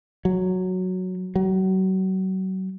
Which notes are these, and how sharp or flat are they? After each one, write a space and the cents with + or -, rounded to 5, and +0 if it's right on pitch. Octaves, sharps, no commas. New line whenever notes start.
F#3 -5
F#3 +35